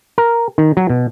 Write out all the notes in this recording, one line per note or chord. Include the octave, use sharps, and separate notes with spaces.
A#4
D#3
F#3
B2